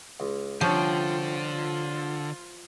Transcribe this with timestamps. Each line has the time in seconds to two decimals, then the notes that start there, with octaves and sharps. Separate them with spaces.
0.20 C#2
0.61 C2 D3 F3 C#4 F4 G5 C#6
1.22 F4